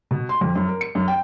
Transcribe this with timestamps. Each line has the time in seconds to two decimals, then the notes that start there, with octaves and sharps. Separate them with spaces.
0.11 B2
0.29 C6
0.41 F2
0.55 F#2
0.69 A#4
0.81 C#7
0.95 F#2
1.08 G5